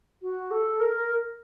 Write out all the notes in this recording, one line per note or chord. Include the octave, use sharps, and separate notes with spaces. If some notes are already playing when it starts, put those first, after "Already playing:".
F#4
A4
A#4